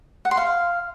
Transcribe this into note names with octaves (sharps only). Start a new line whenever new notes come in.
F#5
C6
F5